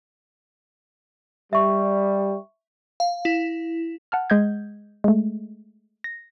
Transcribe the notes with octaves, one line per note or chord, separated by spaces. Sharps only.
G3 E5 C#6
F5
E4
F#5 A5 F6
G#3 D#5 G6 G#6
G#3 A3
A#6